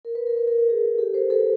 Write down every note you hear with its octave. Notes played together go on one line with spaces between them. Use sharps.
A#4
B4
A#4
B4
A#4
B4
G#4 A#4
G4 A4
A#4 C5
A4 B4